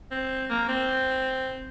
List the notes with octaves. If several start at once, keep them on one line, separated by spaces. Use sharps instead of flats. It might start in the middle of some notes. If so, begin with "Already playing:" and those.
C4
A#3
C4